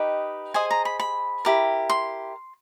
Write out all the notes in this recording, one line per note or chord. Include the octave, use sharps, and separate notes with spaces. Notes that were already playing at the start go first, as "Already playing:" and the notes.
Already playing: D#4 G4 B4 D#5
G#4 C5 D#5 G#5
A#5
B5
B5
E4 G4 A#4
C6